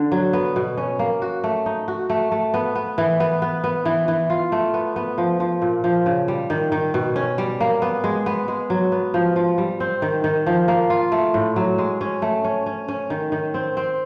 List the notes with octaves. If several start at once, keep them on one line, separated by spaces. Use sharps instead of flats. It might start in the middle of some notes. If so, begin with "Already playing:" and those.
Already playing: D3
F#3
B3
B2
C#4
A#3
F#4
A3
D#4
F#4
A3
A3
B3
B3
E3
B3
B3
B3
E3
E3
F4
A3
B3
B3
F3
F3
A#2
F3
C#3
G3
D#3
D#3
B2
C#4
G3
A#3
B3
G#3
B3
G#3
F#3
B3
F3
F3
G3
C4
D#3
D#3
F3
A#3
F4
A3
A2
F#3
G#3
C#4
A3
C#4
C#4
C#4
D#3
D#3
C4
C4